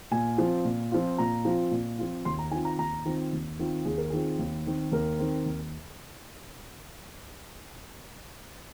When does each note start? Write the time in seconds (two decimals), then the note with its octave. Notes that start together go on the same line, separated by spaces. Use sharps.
0.11 A#2 G#5
0.38 F3 C4 F4
0.65 A#2
0.92 F3 C4 F4
1.18 A#2 A#5
1.45 F3 C4 F4
1.71 A#2
1.99 F3 C4 F4
2.25 D#2 C6
2.39 A#5
2.51 D#3 C4 F4 G#5
2.65 A#5
2.78 D#2 A#5
3.05 D#3 C4 F4
3.33 D#2
3.59 D#3 C4 F4
3.85 D#2 G#4
3.98 A#4
4.10 D#3 C4 F4 G#4
4.39 D#2
4.66 D#3 C4
4.92 D#2 A#4
5.19 D#3 C4
5.46 D#2